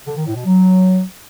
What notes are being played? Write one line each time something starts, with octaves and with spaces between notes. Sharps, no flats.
D3
D#3
A2
B2
F#3